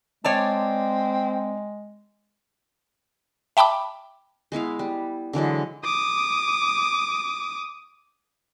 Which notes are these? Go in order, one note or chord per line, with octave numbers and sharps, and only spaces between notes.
G#3 C4 C#5 D5 A5
E5 G5 A5 B5 D6
G#3 B3 E4 F5
G3
D3 E3 F#3 G#3
D6 D#6